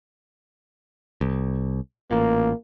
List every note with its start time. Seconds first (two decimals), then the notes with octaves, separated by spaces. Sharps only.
1.21 C2
2.11 A1 A#2 A#3